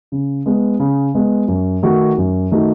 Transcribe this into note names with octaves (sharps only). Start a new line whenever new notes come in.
C#3
G#3 B3
C#3
G#3 B3
F#2
D#3 A3 D#4 F#4
F#2
D#3 A3 D#4 F#4